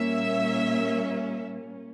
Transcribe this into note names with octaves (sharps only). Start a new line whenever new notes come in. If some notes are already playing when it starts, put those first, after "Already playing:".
Already playing: A#2 G3 A#3 C#4 E5